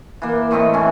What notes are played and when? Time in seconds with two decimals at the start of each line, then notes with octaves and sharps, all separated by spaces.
0.22 E3 A#3
0.51 A2 A3 C4 D#5
0.73 E3 C4 C#4